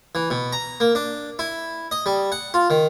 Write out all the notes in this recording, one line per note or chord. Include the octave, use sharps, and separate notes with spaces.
E3
B2
A#5
A#3
D4
E4
D#5
G3
F#5
F4
D#3